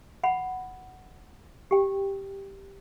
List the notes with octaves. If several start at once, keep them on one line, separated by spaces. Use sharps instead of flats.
F#5 B5
G4 G5